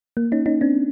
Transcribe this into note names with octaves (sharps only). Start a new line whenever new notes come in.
A#3
C#4 D#4
C#4 D#4
C4 D4